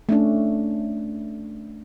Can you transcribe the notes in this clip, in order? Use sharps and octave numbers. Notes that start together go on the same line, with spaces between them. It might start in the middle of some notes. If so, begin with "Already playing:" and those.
A3 C#4 D4